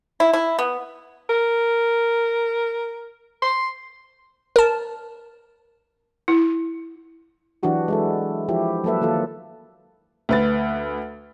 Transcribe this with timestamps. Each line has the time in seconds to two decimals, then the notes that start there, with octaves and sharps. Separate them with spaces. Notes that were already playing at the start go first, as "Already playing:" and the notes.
0.20 E4
0.33 E4
0.59 B3
1.30 A#4
3.42 C6
4.56 A#4 A5
6.28 E4
7.63 E3 F#3 D4 F#4 G4
7.88 G#3 E4 A4
8.49 F3 E4 G4
8.84 F#3 A#3 A4 B4 E5
9.01 D#3 A#3 F4 A4
10.29 D2 B4 A6